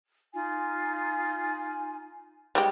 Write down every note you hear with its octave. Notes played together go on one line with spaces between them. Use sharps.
D#4 F4 G#5
G3 G#3 G4